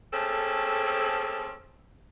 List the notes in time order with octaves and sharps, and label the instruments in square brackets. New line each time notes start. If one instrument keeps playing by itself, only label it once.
[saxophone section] A3 A#3 C4 C#4 G#4 A4